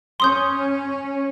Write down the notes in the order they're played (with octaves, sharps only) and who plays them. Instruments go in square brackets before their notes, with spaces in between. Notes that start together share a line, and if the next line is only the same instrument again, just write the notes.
[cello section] C#4 [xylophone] C6 D#6 G6